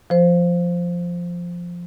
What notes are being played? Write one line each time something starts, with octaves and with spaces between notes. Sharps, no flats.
F3 C5